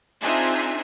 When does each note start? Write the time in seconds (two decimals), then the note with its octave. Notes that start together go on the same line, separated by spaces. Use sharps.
0.23 C4 D4 D#4 F4 G#4 E5